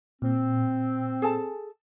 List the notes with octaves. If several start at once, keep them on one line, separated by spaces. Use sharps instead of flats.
A#2 C4
G#4 A4 A5